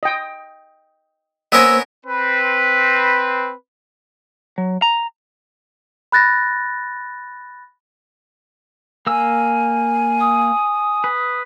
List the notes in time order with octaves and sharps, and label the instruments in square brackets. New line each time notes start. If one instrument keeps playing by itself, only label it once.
[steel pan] D#5 G5
[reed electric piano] A#3 C5 [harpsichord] B3 C#4 A#4 [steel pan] D#5 G#5 [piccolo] E6
[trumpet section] C4 B4
[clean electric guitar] F#3
A#5
[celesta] B5 F#6 A6 A#6
[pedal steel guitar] A#3 E6 [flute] G#5
[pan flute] D#6
[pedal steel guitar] B4